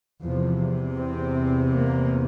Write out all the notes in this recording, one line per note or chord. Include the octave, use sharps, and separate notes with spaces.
E2 C3 F3
C4
A#3